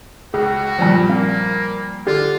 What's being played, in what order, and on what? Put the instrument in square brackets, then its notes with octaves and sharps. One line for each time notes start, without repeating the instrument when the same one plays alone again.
[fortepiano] C#2 [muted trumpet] F#4 [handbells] G#4
[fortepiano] G2 A#2 F3
[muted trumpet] A#3 [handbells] C4 F5
[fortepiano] D3 [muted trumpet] F4 [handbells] G4